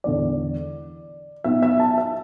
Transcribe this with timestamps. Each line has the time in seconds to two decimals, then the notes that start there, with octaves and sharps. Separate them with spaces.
0.04 E1 E2 D3 D5
1.44 B1 B2 E5
1.63 E5
1.80 A5
1.98 E5